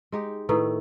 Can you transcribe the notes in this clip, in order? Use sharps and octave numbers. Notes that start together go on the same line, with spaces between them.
G#3 D#4 G4
A2 D#3 A3 B4 A#5 D#6